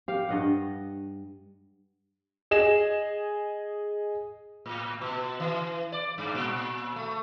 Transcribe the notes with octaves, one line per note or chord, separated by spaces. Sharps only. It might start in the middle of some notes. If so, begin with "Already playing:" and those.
G4 F5
G2 D#5 F#5
G#4 D#5 E7
A2
B2
E3
D5
G2
A#2
A3